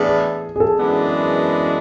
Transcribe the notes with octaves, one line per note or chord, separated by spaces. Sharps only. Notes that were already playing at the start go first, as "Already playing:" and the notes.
Already playing: A2 E3 B3 D4 G#4 A4
G#4
A4
F#2 E3 G#3 B3 D4